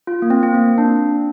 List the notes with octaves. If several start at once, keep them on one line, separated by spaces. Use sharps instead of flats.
F4
A#3
C4
C4
A#3
D4